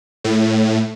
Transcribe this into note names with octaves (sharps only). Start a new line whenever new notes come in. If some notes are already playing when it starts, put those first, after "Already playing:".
A2